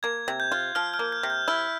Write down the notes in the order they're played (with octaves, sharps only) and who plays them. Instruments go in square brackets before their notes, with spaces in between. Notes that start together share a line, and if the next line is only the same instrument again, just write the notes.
[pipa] A#3 [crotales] G#6
[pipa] C3
[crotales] G6
[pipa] F4
[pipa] F3 [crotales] F6
[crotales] F6
[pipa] A#3
[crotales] G6
[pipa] C3
[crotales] G6
[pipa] E4 [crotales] F6